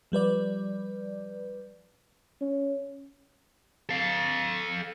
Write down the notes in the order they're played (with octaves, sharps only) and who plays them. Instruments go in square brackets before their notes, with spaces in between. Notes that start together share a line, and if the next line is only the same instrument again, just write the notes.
[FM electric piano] F3 G3 B4 D5
[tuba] C#4
[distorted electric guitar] A4 F5